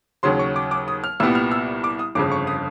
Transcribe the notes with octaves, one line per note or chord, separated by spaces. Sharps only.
D#2 C#3 F#3 C6
C#6
D6
D6
D#6
F6
C2 A#2 G3 B3 E6
F6
E6
D6
D#6
G1 F2 C#3 D6
C#6
D#6